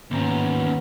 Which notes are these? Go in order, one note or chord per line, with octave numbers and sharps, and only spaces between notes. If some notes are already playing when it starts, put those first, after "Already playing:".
D#2 G#2 B3 C#4 A#5